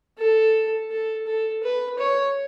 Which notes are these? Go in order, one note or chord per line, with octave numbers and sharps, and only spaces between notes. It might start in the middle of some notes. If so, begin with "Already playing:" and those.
A4
A4
A4
B4
C#5